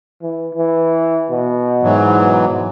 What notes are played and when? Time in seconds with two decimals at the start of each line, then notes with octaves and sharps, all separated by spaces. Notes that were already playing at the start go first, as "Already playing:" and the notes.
0.22 E3
0.55 E3
1.30 B2
1.82 G#2 E3 F#3
2.18 B2